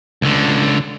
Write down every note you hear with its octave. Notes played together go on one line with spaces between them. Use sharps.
C#2 D3